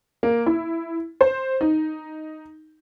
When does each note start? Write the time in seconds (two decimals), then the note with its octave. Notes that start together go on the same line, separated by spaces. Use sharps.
0.23 A#3
0.46 E4
1.21 C5
1.61 D#4